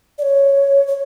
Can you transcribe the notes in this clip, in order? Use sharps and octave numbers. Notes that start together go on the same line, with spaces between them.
D5
C#5
C#5